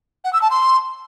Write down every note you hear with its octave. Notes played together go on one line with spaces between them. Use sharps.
F#5
E6
A5
C6